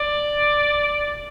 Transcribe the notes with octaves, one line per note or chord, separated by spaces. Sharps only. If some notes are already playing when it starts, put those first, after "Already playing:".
Already playing: D5